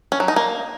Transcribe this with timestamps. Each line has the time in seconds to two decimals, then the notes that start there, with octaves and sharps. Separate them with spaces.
0.12 C#4
0.20 F#3
0.28 D#4
0.36 A#3